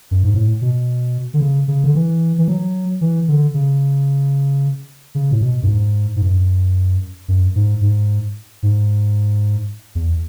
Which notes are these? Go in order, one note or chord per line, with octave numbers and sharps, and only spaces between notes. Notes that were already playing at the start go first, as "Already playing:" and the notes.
F#2
G#2
A2
B2
D3
C#3
C#3
D3
E3
E3
F#3
E3
D3
C#3
C#3
A2
B2
F#2
G#2
G#2
F#2
F#2
G#2
G#2
G#2
E2